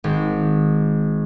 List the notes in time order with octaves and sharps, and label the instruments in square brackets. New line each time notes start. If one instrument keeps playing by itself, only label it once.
[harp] G#1